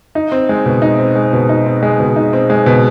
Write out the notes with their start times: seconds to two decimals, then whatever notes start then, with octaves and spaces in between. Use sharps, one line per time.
0.15 D#4
0.32 C4
0.49 G#3
0.66 B2
0.82 D#4
0.99 C4
1.16 G#3
1.33 B2
1.49 D#4
1.66 C4
1.83 G#3
2.00 B2
2.16 D#4
2.33 C4
2.50 G#3
2.66 B2